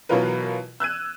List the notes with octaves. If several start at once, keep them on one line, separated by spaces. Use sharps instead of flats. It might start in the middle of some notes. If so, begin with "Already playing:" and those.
B2 E3 F#3 F4 A#4 B4
E6 F#6 G#6 D#7